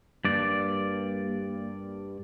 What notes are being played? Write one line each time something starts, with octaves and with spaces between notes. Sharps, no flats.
G2 A#3 D5